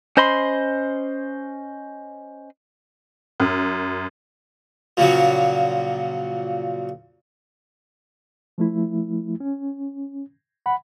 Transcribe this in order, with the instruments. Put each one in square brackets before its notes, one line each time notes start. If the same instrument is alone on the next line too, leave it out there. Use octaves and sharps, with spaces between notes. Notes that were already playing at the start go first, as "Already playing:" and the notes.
[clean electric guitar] C#4 C5 D#5 B5 C6
[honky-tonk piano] F#2
[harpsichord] A#2 C#3 F3 F#3
[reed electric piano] F3 A3 E4
C#4
F#5 B5